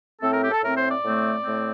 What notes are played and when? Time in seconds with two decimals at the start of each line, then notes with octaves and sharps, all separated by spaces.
0.21 A2 A3 C4 A4
0.31 A#4
0.41 G4
0.51 A4
0.62 A2 A3 C4 A#4
0.76 C5
0.89 D5
1.03 A2 A3 C4
1.43 A2 A3 C4